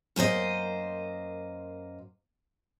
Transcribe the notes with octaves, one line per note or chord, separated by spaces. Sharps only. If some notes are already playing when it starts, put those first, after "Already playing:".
F#2 A#3 C5 D#5